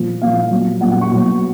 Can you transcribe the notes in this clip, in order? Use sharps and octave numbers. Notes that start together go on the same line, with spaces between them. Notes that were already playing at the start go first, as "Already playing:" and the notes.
Already playing: A#2 F3
A#2 F3 F5
A#2 F#3
A#2 F#3 F#5
F#5
C#6
B2 F#3